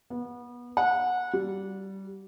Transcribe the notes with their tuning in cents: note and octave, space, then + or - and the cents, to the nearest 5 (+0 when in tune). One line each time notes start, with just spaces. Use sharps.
B3 -25
F#5 -20
G3 -20